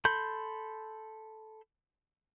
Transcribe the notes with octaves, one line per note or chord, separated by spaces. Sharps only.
A4 B5 C6 G6